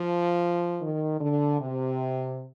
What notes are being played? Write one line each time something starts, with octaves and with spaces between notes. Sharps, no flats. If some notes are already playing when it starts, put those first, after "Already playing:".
Already playing: F3
D#3
D3
C3